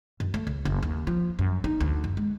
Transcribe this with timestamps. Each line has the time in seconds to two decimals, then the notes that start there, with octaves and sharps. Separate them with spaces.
0.20 F#2
0.34 A3
0.47 C#2
0.65 F#1
0.83 D#2
1.07 F3
1.39 F#2
1.64 D#4
1.80 D2
2.04 F#1
2.17 G#3